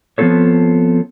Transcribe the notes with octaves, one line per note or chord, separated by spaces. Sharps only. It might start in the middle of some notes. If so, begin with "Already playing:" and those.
F3 B3 C4 F4 A4 C#5